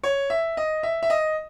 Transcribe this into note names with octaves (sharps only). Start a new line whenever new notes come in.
C#5
E5
D#5
E5
E5
D#5